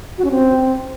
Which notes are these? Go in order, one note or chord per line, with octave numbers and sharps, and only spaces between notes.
F#4
C#4
C4